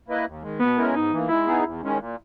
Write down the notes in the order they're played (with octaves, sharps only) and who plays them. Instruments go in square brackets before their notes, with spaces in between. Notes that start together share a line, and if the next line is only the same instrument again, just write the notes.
[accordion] A#3 E4 B4 D#5
D#2
D#3 G#3
[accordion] B2 [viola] B3
[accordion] G#3 C#4 E4 A#4
[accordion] G#2 [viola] D#4
[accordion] E3 A#3
[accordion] G#3 [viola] E4
[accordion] B3 D#4 G#4
E2
D#3 G#3 C#4
A#2